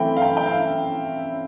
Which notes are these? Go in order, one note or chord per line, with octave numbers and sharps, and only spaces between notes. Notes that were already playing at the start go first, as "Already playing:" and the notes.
Already playing: E3 A3 C4 G5 B5
F5
G5
G5
E5
F5